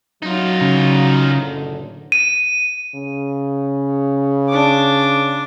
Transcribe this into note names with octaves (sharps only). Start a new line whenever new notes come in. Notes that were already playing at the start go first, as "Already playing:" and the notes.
F#3 D#4 F4
C#3
F#1 A2 D3
D#7
C#3
D4 D6